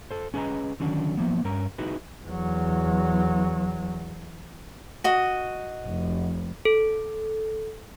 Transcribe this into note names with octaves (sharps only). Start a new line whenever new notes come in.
A4 C5
C#4 G#4 B4 D#5 A#5
D3 D#3 F#3 C#4 D4
F3 A#3 B3
G2 C#4 A#4 A#5
D#4 E4 F#4 G#4 B4
E2 F#3
F#4 D#5
F1
A4